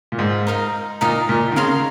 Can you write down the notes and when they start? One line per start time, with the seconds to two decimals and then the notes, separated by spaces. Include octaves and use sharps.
0.12 A#2
0.19 G#2
0.47 D#4 A#4 F5
1.01 A#2 D#4 A#4 F5
1.29 A#2
1.52 D#3
1.56 C#3 A#4 F5 C6